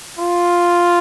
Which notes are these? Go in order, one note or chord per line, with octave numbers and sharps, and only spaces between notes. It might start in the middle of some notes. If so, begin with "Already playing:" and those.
F4